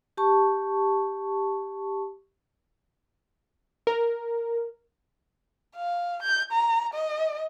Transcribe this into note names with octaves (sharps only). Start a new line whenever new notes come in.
G4 A5 C#6
A#4
F5
G6
A#5
D#5